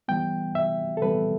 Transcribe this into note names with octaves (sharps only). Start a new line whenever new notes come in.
E3 G3 B3 G5
E5
A4
E3 G3 B3 B4